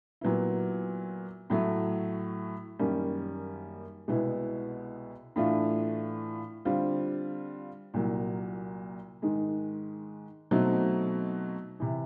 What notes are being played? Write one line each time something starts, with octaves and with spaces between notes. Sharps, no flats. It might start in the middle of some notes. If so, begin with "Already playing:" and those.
A#2 F#3 B3 E4
A2 F#3 A3
F#2 D#3 G3 A#3 C#4
C2 B2 G#3 B3 E4
A2 E3 A3 D4 F4
D3 G3 C4 F4
C2 A#2 F#3 A#3
G#2 D#3 G#3
B2 F#3 A3 C4 D#4
C3 E3